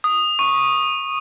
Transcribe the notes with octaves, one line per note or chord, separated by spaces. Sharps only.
D#6
C#6